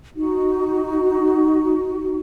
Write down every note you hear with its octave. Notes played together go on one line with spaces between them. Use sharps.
D#4 F#4